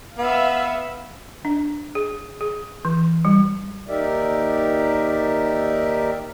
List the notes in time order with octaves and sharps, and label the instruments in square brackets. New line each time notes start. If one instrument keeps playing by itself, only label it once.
[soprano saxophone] B3 [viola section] E5 F5
[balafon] D4
G#4
G#4
E3
G3
[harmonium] D#2 D#4 G4 A#4 D5 E5